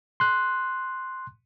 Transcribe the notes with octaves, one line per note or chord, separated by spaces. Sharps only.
C6 F#6